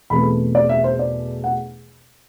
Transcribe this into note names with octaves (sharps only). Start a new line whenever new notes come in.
E2 B2 A3 C4 B5
D5
E5
C5
D5
F#5